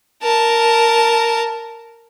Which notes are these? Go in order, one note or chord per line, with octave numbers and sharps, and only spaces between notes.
A#4 A5